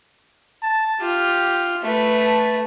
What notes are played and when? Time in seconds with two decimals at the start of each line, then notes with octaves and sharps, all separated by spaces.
0.63 A5
1.01 F4 G4
1.83 A3 B4
2.18 A5